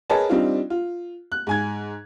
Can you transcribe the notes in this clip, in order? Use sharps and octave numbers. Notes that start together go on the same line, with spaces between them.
G#4 A#4 B4 C#5 D#5 A5
G3 C4 D4 D#4 F4
F4
F#6
G#2 G#5 G#6